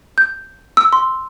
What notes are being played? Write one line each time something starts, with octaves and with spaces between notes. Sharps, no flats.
G6
E6
C6